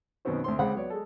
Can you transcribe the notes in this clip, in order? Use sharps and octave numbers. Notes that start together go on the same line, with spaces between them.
F#2 B2 D#3 B3 C4 F#4
D2 C4 C6
C#2 G#3 C4 F5 F#5 B5
F#3 B3 C#5 D5
G#3 A4